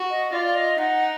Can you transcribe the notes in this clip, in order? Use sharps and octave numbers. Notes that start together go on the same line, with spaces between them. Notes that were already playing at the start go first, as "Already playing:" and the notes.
Already playing: F#4
D#5
F4 D5
D#5
D#4 F#5